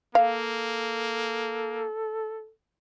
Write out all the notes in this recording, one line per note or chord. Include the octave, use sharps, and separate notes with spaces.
A#3 A4 F5